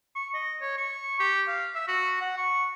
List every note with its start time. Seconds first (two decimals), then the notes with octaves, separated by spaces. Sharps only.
0.16 C#6
0.34 D#5
0.61 C#5
0.78 C#6
1.20 G4
1.48 F5
1.75 E5
1.88 F#4
2.21 F#5
2.37 C#6